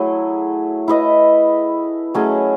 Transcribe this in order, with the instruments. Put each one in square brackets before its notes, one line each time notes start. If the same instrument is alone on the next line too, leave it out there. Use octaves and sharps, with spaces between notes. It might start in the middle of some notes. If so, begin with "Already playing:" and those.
Already playing: [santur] F#3 A3 E4 G#4
E4 B4 D#5
F#3 A3 C#4 G#4